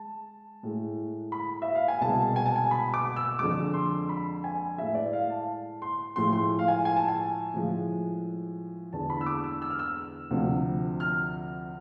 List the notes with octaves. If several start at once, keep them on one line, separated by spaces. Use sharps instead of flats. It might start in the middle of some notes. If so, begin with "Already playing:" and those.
Already playing: G#3 A5
A2 G#3
B5
E5
F5
G#5
C2 B2 G#3 A5
G#5
A5
G#5
B5
D6
E6
F2 D3 G#3 D6
C6
B5
G#5
A2 G#3 E5
D5
F5
A5
C6
A2 F3 G#3 C6
C6
F5
G#5
G#5
A5
G#5
A2 F3 G#3
E2 D3 G#3 A5
B5
E6
D6
E6
E6
F6
E6
D2 C3 F3
F6